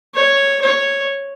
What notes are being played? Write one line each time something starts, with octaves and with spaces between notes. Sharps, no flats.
C#5
C#5